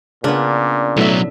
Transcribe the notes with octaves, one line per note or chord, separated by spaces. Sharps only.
A#2 C#3 B3 D4
B1 A2 F#3 E5